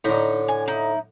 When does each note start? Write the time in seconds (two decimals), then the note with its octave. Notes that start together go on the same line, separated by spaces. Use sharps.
0.04 A2 D3 D#4
0.48 G#5
0.67 D#4 E4